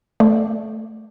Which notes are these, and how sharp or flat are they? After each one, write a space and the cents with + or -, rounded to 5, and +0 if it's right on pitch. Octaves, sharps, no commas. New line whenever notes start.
A3 +0 D5 +0